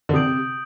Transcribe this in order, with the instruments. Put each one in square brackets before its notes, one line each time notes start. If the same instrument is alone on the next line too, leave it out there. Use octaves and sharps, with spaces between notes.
[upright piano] D3
[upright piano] C3 [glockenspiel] D#6 G6 D7 F#7